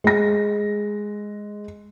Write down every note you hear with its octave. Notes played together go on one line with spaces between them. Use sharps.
G#3 A#6